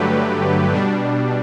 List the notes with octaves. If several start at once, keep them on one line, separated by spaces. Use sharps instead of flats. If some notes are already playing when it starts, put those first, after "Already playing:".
Already playing: G2 D3 F#3 A3 G4 B4
B2 G3 D4